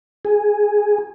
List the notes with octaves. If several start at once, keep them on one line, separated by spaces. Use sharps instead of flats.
G#4